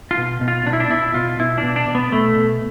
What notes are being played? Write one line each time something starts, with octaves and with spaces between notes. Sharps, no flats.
F4
B2
B2
F4
B2 D4
E4
D4
B2 E4
B2 F4
B2 E4
D4
B2
D4
B2
B3
B2 A3
B2